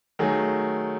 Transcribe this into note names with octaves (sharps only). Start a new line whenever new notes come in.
D#3 F#3 A3 G#4